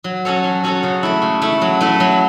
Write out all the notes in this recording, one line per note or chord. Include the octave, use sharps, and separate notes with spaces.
F#3
C#4 F#4 A4 C#5
F#3
C#4 F#4 A4 C#5
C#3
A3 E4
C#3
A3 E4
F#3
A3 E4 B4
F#3